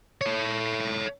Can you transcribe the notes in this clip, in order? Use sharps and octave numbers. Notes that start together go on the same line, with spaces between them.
A4 C#5